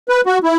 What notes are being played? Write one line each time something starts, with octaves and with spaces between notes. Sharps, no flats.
B4
F#4
E4